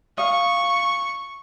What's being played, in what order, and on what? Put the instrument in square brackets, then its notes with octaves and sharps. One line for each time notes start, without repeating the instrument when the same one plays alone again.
[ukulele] D#5 F5 [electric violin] C#6